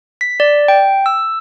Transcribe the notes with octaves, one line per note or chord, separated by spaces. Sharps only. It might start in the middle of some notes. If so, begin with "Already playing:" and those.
B6
D5
G5
E6